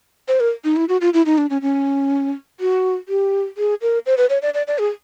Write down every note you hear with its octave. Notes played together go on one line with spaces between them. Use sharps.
C5
A#4
D#4
E4
F#4
F4
E4
D#4
D4
C#4
C#4
F#4
G4
G#4
A#4
C5
B4
C#5
D5
D5
D5
G#4